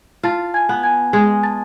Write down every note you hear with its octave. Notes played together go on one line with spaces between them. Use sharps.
F4 A5 A6
G#5 G#6
B3
G#5 G#6
G#3 G#5 G#6
A5 A6